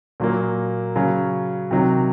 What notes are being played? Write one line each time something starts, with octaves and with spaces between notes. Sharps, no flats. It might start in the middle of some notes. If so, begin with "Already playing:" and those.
A#2 F#3 A#3
C#3 F#3 C#4
C3 D#3 F#3